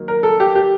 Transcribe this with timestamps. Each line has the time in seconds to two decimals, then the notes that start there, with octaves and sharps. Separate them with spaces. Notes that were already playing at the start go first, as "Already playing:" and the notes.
Already playing: D#3 F#3 A#3
0.08 A#4
0.23 A4
0.40 G4
0.55 G4